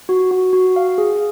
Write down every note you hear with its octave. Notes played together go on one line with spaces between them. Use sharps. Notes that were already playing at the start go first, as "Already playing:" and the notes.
F#4
F#4
F#4
F5
G#4